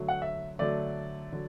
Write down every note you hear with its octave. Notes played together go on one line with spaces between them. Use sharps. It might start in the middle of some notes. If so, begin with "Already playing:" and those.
Already playing: D3 F#3 A3
F#5
E5
D3 F#3 A3 D5
D3 F#3